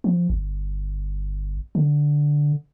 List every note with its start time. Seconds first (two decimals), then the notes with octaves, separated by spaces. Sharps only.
0.04 F3
0.30 G1
1.75 D3